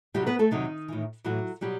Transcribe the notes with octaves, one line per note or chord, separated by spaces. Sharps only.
E2 C3 F#3 G3 G4
B3 B4
A3 A4
E2 C3 D#3 F#3 D#4
A2 E3
A2 E3 F#3 F#4
B2 F#3 G3 G4